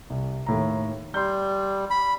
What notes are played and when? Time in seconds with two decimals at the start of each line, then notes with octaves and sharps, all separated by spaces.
0.10 C2
0.46 D#2 A2 A#5
1.14 G3 C6 G6
1.90 B5